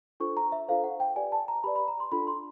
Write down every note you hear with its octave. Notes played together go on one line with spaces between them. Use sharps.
D4 F4 A4 C5 C#6
A#5
E5
D4 F4 A4 C5 F5
F#5
G5
G4 B4 D5 G#5
A5
A#5
G4 B4 D5 B5
B5
A#5
C6
D4 F4 A4 B5
C6